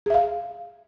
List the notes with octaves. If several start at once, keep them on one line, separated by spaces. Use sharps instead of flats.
G#4 E5 F5